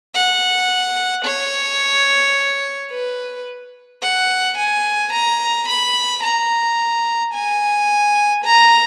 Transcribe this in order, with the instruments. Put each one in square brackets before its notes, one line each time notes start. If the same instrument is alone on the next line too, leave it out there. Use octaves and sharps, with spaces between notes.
[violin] F#5
C#5
B4
F#5
G#5
A#5
B5
A#5
G#5
A#5